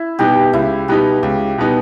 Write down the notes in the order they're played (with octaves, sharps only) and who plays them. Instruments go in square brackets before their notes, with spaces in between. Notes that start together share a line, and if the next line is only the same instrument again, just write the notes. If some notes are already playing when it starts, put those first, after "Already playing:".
Already playing: [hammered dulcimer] E4
[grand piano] B2 G3 B3 D#4 [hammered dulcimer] G4
[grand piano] C#2 [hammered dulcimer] E4
[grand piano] B2 G3 B3 D#4 [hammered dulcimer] G4
[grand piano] C#2 [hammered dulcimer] G4
[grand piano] B2 G3 B3 D#4